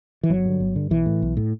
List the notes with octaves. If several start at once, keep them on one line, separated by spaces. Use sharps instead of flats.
E3
G1 F#3
G2 D3
G1
G2 D3
B1 E3
A2
B1
A2